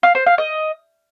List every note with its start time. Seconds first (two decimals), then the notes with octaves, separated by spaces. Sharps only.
0.03 F5
0.15 C5
0.26 F5
0.38 D#5